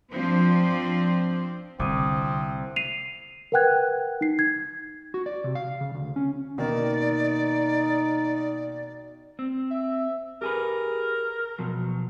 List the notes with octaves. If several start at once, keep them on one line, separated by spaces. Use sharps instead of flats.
F3 C4 D4 C5
C2 D3 C4 D6 D#6 D#7
C7 D#7 F7
A#4 B4 F#5 G5 F#6 G#6
D#4 C7
G#6
F#4
D5
C3
F5
C#3
D2
C#4
B2 D#3 A#3 D#4 D5
C4
E5
G4 G#4 A#4 B4
B2 F3 F#3